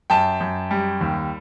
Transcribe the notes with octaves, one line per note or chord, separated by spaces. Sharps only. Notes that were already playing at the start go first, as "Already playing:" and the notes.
F#2 G5 A5
F#2
G3
D#2